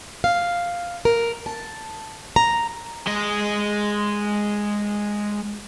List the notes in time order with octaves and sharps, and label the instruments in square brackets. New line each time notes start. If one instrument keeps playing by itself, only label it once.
[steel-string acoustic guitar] F5
A#4
A5
A#5
[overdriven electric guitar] G#3 D#5